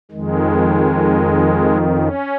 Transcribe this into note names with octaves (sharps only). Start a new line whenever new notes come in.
F2 D#3 G#3
C#4